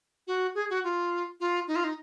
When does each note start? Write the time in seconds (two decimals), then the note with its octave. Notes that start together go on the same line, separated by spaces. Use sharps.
0.27 F#4
0.55 G#4
0.70 F#4
0.84 F4
1.40 F4
1.68 D#4
1.76 F4
1.84 D#4